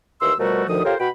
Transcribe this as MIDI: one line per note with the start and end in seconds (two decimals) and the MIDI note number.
0.21 0.33 39
0.21 0.33 52
0.21 0.33 84
0.21 0.33 88
0.40 0.64 47
0.40 0.64 53
0.40 0.64 55
0.40 0.64 57
0.40 0.64 66
0.40 0.64 70
0.68 0.83 38
0.68 0.83 51
0.68 0.83 53
0.68 0.83 87
0.85 0.94 65
0.85 0.94 67
0.85 0.94 69
0.85 0.94 70
0.85 0.94 72
0.85 0.94 73
1.00 1.09 47
1.00 1.09 66
1.00 1.09 79
1.00 1.09 83